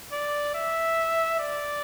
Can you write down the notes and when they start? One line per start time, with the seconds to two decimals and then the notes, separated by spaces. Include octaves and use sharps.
0.13 D5
0.55 E5
1.39 D5